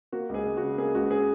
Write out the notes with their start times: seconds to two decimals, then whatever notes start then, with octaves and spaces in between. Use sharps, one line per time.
0.12 A#3 F#4
0.29 C#2 G#4
0.46 C#2
0.57 C#3 F#4
0.78 A#3 G#4
0.94 C#2 F#4
1.11 G#4